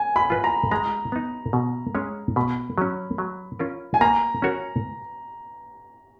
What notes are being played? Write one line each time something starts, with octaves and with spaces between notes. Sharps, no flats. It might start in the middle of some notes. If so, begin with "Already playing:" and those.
Already playing: G#5
B5
F4 B4 D#5
A#5
G#3 A#5
B3 D#4
B2
G#3 C#4 G#4 C#5
B2 B5
F#3 C#4
F#3
C#4 F4 A#4
G#5
A#3 A#5
C#4 F#4 A#4 C#5